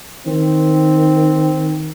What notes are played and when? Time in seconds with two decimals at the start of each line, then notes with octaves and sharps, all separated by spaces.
0.27 D#3 C4